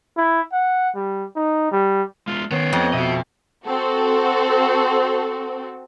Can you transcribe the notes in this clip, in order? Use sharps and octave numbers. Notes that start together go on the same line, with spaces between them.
E4
F#5
G3
D#4
G3
G#3 B3 F4
D#3 B3 C5 C#5
F2 D#5
B2 F#4 D#5 E5
C4 F#4 A4